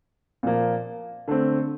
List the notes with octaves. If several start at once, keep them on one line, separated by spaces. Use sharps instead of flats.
A#2 F3 A#3
D3 A3 C4